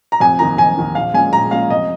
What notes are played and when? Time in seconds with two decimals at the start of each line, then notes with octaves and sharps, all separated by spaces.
0.12 A#5
0.20 F1 G#5
0.39 D#2 D#3 A#5
0.58 F1 G#5
0.77 D#2 D#3
0.95 A#1 F5
1.14 A#2 G#3 C#4 G#5
1.32 A#1 A#5
1.51 A#2 G#3 C#4 F5
1.70 F1 D#5